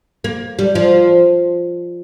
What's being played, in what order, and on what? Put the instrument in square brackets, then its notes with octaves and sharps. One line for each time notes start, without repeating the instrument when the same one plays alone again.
[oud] A#3
G3
F3